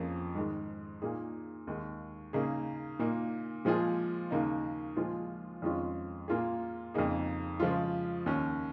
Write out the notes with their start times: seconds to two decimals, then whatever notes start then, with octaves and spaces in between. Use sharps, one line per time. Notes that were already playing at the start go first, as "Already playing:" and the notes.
Already playing: F2 F3 A#3 C#4 G#4
0.35 G#2 D#3 G#3
1.02 A#2 A#3 D#4 G#4
1.67 D#2 D#3 G#3
2.33 C#3 A#3 D#4 G#4
2.99 A#2 A#3 D#4
3.65 A#2 F3 G#3 F4 G#4
4.31 D#2 C#3 A#3 D#4
4.96 A#2 F3 G#3 F4 G#4
5.62 F2 D#3 G#3 C#4 F4
6.28 A#2 A#3 F4 G#4
6.94 F2 C#3 A#3 D#4 G#4
7.60 C#3 F3 G#3 F4
8.26 D#2 D#3 C#4